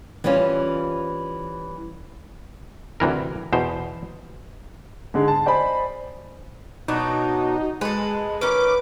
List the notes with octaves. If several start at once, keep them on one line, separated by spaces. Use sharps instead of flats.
E3 G3 C4 C#4 F4
D2 C3 E3 A#4
E2 B2 C5
G#2 D3 G#3
A5
C5 D5 D#5 G#5 B5
B2 F#3 D4 D#4
G#3 A4 B4
D#3 C#4 B4 D6